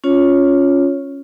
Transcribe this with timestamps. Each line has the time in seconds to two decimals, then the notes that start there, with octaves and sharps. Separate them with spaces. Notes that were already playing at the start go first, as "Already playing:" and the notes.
0.04 C#4 F4 C#5